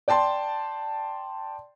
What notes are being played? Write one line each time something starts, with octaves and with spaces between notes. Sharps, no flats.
D5 G5 A5 C6